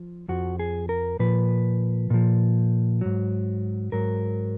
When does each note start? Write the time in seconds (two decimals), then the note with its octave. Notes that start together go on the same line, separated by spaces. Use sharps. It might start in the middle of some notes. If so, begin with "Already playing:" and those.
Already playing: F3
0.29 F2 F3 F#4
0.59 G#4
0.89 A#4
1.19 A#2 F3 B4
2.10 A#2 F3
3.01 G#2 F#3
3.92 G#2 F#3 A#4